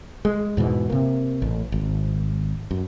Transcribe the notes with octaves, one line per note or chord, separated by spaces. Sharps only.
G#3
E2 G#2 B2 E3
C3 A#3
A1
G#1
F#2